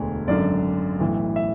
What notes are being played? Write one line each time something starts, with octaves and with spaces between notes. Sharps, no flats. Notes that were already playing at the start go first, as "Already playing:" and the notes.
Already playing: E1 D2 D3
G#1 F#2 D3 D5
B1 A2 E3
E5